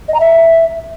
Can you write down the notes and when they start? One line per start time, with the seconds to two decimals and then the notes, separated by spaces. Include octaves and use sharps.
0.08 D#5
0.14 A#5
0.20 E5